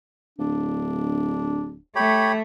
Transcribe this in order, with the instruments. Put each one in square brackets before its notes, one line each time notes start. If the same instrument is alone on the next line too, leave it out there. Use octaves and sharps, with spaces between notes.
[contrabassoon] D1 [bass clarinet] D4
[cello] A3 [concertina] G4 C#5 B5